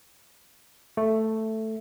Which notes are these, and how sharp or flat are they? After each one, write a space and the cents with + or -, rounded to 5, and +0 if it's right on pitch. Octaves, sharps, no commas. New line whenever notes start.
A3 +5